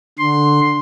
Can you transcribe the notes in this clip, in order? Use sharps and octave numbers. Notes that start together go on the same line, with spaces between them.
D3 C6